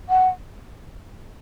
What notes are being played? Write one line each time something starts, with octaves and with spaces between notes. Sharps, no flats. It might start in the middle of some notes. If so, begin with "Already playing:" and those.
F#5